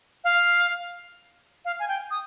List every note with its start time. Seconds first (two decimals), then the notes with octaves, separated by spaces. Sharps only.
0.24 F5
1.65 F5
1.80 G#5
1.88 G5
2.11 D#6